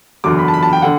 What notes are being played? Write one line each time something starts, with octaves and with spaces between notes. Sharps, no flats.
F#1 E2 D3 F#3 D6
B5
A5
B5
A5
G5
D3 F#5